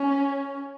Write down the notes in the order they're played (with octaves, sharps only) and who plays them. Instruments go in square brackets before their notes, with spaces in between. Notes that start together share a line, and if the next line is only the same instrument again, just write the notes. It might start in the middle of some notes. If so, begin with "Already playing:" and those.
Already playing: [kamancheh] C#4